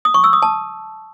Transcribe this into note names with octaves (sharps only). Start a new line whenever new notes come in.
D#6
C#6
E6
D#6
A5